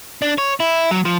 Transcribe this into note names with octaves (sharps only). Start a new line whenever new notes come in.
D4
C#5
E4
F#3
F3